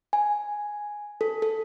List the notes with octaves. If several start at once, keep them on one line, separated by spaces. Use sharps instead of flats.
G#5
A4
A4